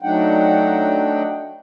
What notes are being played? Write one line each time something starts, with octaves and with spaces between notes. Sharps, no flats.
F#3 A3 D4 D#4 F#5 G5